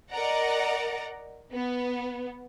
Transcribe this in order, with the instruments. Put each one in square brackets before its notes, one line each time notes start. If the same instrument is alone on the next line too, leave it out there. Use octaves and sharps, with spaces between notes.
[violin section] A#4 D5 D#5 F#5 A#5
B3